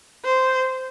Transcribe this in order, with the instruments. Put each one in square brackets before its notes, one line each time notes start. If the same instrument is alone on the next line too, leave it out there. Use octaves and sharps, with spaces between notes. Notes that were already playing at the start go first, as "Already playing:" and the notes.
[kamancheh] C5